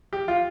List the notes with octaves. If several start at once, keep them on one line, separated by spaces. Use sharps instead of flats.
G4
F4